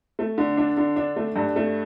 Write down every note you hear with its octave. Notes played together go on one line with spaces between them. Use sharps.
A3
D3
D4
D3
D4
A3
G2
A3